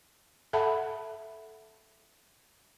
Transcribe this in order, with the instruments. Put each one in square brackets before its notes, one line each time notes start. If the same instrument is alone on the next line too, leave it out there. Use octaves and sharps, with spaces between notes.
[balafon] A4 E5 F#5 A5 B5